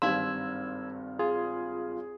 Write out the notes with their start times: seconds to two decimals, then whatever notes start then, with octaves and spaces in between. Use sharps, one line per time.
0.02 G#1 G2 D#4 F5 C6 E6 G#6
1.19 F4 G#4